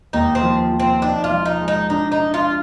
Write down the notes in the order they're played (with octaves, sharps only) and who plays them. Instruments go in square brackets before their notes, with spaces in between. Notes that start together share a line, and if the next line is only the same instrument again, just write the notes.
[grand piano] D#2 [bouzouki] D#4
[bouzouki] C4
[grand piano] F3
F3
[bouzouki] C4
[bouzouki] D4 [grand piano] D#4
[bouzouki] F4
[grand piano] F3
[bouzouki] D#4
[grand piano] G#3
[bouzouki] D#4
[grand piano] D4 [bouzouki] D#4
[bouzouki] D#4
[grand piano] D4
[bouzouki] F4